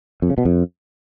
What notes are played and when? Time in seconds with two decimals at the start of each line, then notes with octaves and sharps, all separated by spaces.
0.22 F2
0.30 C#3
0.38 B2
0.45 F2